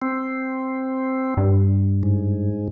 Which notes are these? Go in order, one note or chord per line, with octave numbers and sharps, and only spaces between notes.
C4
G2
G#2